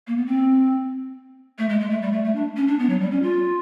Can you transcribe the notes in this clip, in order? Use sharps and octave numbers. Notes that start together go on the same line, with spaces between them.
A#3
B3
C4
A3
G#3
G#3
A3
G3
A3
A3
D4
C#4
D4
B3
F#3
G3
C#4
F4